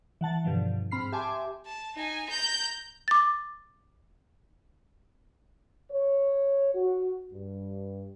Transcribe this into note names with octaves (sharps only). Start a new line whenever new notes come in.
E3 F#5 A5 A6
G2 B2 D3 F3
G#2 C4 B5 F6 C7
G4 E5 G#5 A5 C6 D6
A5
D#4 G#5
A#5 G6
D6 A6
C#5
F#4
G2